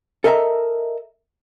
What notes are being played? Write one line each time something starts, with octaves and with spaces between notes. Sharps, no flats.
A4 A#4 D#5 E5 G#5 A#5